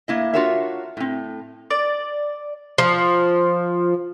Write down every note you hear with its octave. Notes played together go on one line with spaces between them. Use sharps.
A2 A#3 E4 D#5
D4 F4 F#4 A#4 C#5 E5
A2 C4
D5
F3